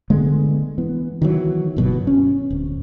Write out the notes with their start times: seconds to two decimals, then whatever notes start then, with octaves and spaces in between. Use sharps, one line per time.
0.10 D3 G#3 A3 B3
0.78 E3 B3
1.22 D#3 E3 F#3
1.77 G1 B2 F#3
2.07 C#4
2.50 D1